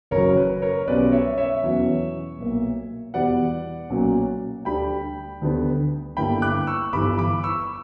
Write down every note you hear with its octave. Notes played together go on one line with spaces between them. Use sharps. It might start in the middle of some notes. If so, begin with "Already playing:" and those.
F#1 F#2 C#3 F#3 A#4 C#5
B4
A#4 C#5
B1 B2 G3 C#4 B4 D5
C#5 E5
C#5 E5
E2 B2 F#3 C#4
B1 A#2 A#3
E2 B2 G3 B3 D5 F#5
B1 A#2 F#3 A#3 C#4
D2 D3 G3 G5 B5
D2 D3 G3 B3 D4
G1 G2 D3 A#3 E4 G5 B5
D6 F#6
C#6 E6
G1 G2 E3 B5 D6
B5 D6
C#6 E6